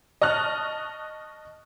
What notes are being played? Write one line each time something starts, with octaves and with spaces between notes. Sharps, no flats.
D#5 A5 C#6 F6 F#6